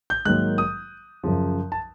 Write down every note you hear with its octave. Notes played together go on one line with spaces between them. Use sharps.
G6
G#2 D#3 F#3 A#3 F#6
D#6
F#2 C#3 F3
A5